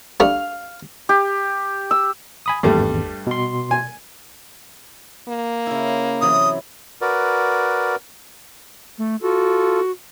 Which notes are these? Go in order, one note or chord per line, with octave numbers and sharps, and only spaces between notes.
G3 A3 D4 F5
G4
E6
G#5 B5 D#6
G#1 E2 G2 G3 A3
B2 C6
G#5
A#3
C#3 E4
C3 E3 F#3 D#6
F#4 A#4 B4 D5
A3
F4 F#4 A4